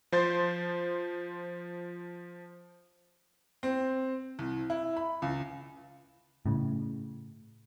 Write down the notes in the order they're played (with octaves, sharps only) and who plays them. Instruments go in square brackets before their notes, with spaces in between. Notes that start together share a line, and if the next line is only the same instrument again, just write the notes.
[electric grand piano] F3 C5 C6 A6
[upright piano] C4
C2
E4
B5
C#2
[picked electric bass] A2 C#3